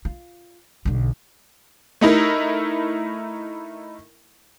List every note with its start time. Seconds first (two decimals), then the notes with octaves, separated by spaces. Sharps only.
0.05 F4
0.85 B1 D3
2.01 A3 D#4 E4 A#4